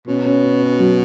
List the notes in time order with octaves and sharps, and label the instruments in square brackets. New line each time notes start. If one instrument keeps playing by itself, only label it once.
[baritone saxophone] B2 [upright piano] C#4
[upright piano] C#4
C#4
C#4
F#3